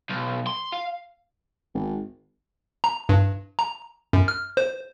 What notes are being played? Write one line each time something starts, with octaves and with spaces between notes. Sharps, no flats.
B1
C6
F5
G#1
A#5
G2
A#5
F#2
F6
C5